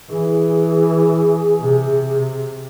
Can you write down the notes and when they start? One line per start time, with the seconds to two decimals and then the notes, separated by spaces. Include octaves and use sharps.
0.10 E3 G#4
1.60 C3